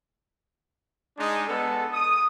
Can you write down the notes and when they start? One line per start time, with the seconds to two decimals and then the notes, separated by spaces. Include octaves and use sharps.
1.18 G#3 D4 D#4 D#6
1.48 G#3 B3 A4
1.93 D#6